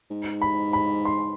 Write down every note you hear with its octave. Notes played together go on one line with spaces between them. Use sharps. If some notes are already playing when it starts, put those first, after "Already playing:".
G#2
B5
B5
C6